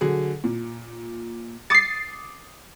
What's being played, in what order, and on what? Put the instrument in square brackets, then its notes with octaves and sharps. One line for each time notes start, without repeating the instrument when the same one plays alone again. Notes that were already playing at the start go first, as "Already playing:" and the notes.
[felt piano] D3 F#3 G#4
A#2
[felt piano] D6 D#6 C#7 [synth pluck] A6 C7